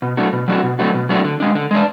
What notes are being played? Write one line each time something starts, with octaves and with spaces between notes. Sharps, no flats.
B2
F#3 A3 D4 F#4
B2
F#3 A3 D4 F#4
B2
F#3 A3 D4 F#4
B2
F#3 A3 D4 F#4
D3
G#3 D4
D3
G#3 D4